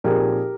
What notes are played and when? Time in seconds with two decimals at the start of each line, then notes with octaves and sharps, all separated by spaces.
0.04 A#2 F3 C4 D#4 G4 G#4 A#4